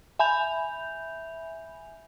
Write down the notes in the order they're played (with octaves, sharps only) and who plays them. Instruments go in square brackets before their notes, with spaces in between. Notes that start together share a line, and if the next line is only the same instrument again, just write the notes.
[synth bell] E5 G#5 B5 G6 F7